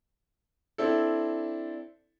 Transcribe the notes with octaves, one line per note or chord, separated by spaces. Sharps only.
C4 D4 E4 A4